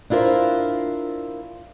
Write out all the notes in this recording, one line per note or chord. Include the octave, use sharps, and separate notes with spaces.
D4 E4 F4 A#4 C5